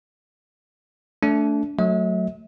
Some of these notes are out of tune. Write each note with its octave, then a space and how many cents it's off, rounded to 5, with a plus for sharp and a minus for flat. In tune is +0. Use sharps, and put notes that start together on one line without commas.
A3 -5 D4 -30
F#3 +0 A3 +0 E5 -45